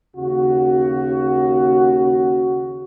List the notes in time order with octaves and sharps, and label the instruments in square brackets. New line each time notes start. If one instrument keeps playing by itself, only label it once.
[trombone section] D#2 C#3 F#4